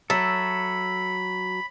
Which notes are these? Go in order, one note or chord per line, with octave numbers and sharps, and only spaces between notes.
F#3 A4 E5 B5